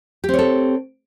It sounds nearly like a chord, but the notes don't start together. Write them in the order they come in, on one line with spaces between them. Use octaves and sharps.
G4 C4 C#5 A4